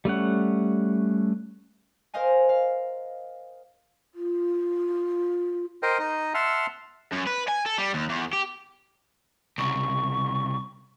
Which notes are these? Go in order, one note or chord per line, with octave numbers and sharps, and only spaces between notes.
G3 A3 C#4 F#5
A#4 C5 D#5 F5 G#5
F5
F4
A#4 C5 D#5 G5
D#4 D#5
E5 F#5 A5 C6 E6 F6
F#2
B4
G#5
A4
G3
D#2
E2
G4
C2 C#3 C#6